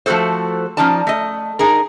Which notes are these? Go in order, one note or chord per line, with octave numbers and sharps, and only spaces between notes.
F3 A3 F4 F#4 A4 C5
F3 C#4 D#4 D5 A5
A3 D#5
D#4 G#4 A#4